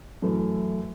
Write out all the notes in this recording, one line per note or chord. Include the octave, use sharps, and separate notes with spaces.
F#2 E3 A3 E4